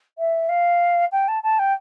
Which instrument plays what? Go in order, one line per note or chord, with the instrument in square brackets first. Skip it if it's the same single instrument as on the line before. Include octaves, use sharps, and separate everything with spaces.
[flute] E5
F5
G5
A5
A5
G5